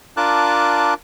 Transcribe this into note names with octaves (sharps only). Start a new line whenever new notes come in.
D4 F4 A#4 A5 D6 F#6